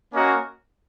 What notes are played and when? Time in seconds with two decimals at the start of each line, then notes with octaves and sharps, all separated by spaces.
0.13 A#3 C#4 F#4 A#4 D#5